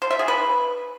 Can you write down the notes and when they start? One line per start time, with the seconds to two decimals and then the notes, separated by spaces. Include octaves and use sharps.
0.02 C5
0.10 E5
0.19 G#4
0.28 B4